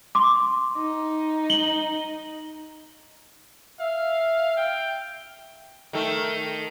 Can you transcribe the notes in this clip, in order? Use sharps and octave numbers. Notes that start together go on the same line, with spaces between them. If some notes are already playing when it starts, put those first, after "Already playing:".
C6 D6
D#4
F#7 G7
E5 F5
G5
D#3 A3